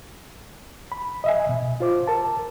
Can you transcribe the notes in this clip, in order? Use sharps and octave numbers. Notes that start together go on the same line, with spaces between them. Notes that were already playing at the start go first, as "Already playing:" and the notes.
B5
D#5 E5 G#5
B2
F4 C5 D6
A#4 A5